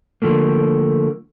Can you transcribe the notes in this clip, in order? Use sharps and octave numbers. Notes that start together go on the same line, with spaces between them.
D3 F3 A3 A#3